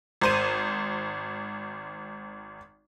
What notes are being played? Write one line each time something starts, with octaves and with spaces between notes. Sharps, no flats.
G#1 C5 D#7